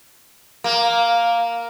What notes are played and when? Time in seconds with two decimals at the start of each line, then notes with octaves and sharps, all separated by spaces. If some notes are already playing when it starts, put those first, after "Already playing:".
0.64 A#3